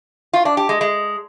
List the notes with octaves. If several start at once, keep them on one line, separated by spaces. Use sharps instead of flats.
F4
D4
G4
G#3
G#3